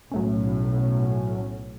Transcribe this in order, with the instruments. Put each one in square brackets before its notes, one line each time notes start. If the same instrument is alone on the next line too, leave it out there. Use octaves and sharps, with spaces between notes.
[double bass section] B1 A2 [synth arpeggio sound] F#3 A3 C#4